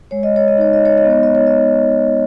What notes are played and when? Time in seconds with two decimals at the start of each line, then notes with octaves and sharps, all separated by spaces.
0.11 G#3 C#5
0.23 D#5
0.36 C#5
0.48 D#5
0.58 D#4 C#5
0.73 D#5
0.85 C#5
0.98 D#5
1.05 B3
1.10 C#5
1.23 D#5
1.35 C#5
1.47 D#5